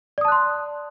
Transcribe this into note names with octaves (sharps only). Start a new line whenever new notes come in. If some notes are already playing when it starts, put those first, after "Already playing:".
D5 A5 C6 D#6 F#6